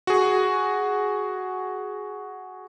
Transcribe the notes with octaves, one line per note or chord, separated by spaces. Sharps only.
F#4 G#4